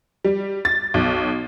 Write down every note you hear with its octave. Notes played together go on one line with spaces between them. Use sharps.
G3
A6
B1